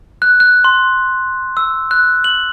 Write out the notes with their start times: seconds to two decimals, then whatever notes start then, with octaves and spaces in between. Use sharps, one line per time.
0.22 F#6
0.40 F#6
0.64 C6
1.57 E6
1.91 F#6
2.24 F#7